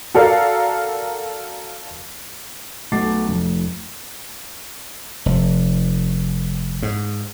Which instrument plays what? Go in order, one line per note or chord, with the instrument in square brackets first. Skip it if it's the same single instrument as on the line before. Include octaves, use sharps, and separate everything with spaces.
[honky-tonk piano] F#4 A4 A#4 D5 F5
[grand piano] B1 A3 F#5 D6 A6 C7
F1
[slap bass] F1
G#2